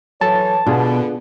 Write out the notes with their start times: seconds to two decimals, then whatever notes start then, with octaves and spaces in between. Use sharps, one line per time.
0.21 E3 F#3 A4 C#5 A5
0.67 B2 D3 B3 D4 F4 G#4